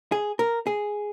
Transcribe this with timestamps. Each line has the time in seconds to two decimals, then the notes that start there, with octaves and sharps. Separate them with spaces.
0.12 G#4
0.39 A#4
0.67 G#4